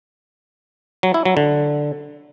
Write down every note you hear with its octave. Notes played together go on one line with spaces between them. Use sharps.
F#3
E4
F#3
D3